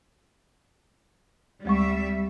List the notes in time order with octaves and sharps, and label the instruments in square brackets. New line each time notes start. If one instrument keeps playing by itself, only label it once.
[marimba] D2 G#3 C#6 [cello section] G3 E5